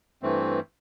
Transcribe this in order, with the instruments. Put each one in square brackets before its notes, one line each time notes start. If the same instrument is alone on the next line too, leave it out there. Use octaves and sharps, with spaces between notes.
[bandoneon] G2 E3 A3 C4